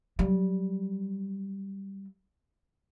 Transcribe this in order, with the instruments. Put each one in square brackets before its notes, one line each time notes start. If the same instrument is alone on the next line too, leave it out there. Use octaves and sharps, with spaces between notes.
[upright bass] F#3 G3